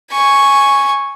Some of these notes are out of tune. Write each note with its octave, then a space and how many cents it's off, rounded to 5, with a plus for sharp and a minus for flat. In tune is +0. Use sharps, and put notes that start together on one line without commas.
G#5 +0 C#6 +0